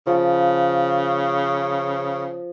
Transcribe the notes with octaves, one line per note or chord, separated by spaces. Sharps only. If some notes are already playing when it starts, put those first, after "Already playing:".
C#3 F3